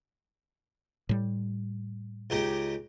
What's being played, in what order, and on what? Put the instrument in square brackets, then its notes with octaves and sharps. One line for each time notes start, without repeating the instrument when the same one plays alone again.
[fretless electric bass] A2 G3
[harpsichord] C#2 D#4 G4